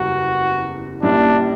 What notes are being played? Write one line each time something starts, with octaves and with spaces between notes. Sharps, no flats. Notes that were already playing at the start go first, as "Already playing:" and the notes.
Already playing: F#1 E2 C#3 G3 F#4
A#1 A#2 G3 C#4 D4 E4